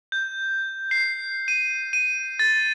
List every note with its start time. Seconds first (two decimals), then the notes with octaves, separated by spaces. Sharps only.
0.12 G6
0.91 C7
1.48 D#7
1.93 D#7
2.39 A6